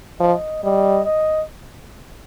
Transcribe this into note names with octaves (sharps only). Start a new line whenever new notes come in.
F3 D#5
G3 D#5
D#5